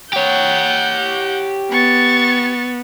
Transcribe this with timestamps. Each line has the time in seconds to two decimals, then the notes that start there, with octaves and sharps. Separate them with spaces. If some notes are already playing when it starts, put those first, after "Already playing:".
0.13 G4 C#5 F#5 G6
1.71 B3 C#6 A6